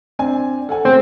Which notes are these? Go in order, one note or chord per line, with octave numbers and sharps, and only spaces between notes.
C4 D4 G#5
A4 F#5 G#5
B2 G#3 A3 C4